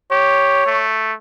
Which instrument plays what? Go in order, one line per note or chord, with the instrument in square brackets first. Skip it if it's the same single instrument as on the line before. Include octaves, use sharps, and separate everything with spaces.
[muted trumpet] G4 [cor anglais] C#5
[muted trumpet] A3